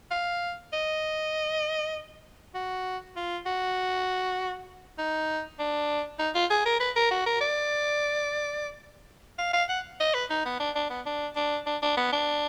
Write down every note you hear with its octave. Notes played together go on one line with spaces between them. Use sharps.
F5
D#5
F#4
F4
F#4
D#4
D4
D#4
F4
G#4
A#4
B4
A#4
F#4
A#4
D5
F5
F5
F#5
D#5
B4
D#4
B3
D4
D4
B3
D4
D4
D4
D4
B3
D4